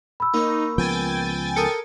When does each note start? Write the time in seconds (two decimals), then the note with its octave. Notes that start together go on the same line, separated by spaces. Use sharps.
0.20 B5 E6
0.34 A#3 D#4 C#5
0.78 C#2 F3 B3 G5 G#5 A6
1.56 A4 A#4 D#6 C#7